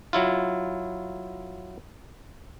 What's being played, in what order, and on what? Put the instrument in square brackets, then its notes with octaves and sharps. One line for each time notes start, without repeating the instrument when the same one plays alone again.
[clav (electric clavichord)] F#3 E4 F4